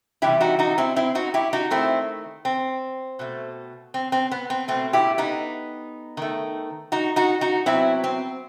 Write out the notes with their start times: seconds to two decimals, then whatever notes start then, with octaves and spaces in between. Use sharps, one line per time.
0.22 C3 E3 G3 E4 G4
0.41 D#4 F#4
0.59 D#4 F#4
0.78 C4 E4
0.96 C4 E4
1.15 D#4 F#4
1.34 E4 G4
1.53 D#4 F#4
1.70 D#3 A3 C4 E4
2.45 C4
3.19 B2 A3
3.94 C4
4.12 C4
4.31 B3
4.50 C4
4.68 B2 A3 C4
4.93 E4 G4
5.18 B3 D#4
6.17 D#3 A3
6.92 D#4 F#4
7.16 D#4 F#4
7.41 D#4 F#4
7.66 C3 F#3 B3 C4 E4
8.04 C4